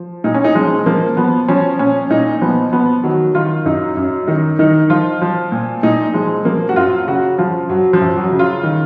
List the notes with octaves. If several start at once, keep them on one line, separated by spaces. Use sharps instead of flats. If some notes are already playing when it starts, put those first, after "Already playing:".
Already playing: F3
A#2 D#4
C#4
D#4
F3 G#3
F3 A#3
F3 B3
F3 C#4
A#2 C#4
A#2 D#4
F3 B3
F3 B3
D#3 F#3
D#3 F4
F#2 D#4
F#2
D#3 D#4
D#3 D#4
F3 F4
F3
A#2
A#2 D#4
F3 G#3
F3 A#3
F#4
F#2 F4
C#3 F#4
F3 F4
F#2 F#3
F3
F#2
F#3
C#3
F4
D#3